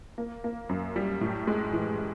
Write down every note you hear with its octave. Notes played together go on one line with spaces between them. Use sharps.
A#3
A#3
F#2
G3
A2
G#3
E3